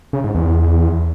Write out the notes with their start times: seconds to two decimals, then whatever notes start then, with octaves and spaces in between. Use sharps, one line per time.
0.13 C#3
0.24 G#2
0.35 E2